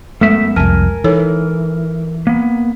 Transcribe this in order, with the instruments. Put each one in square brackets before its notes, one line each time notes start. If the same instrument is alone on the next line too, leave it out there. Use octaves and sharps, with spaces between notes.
[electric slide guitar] F#2 B3 E5 [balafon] G#3 [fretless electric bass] A3
[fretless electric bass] C2 F2 [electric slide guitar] A#4 G#5 [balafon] A5
[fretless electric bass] E3 [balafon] D#4 A4 C#5
[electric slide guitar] A#3 B3